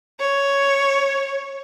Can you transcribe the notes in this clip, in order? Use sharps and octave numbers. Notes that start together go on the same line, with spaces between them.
C#5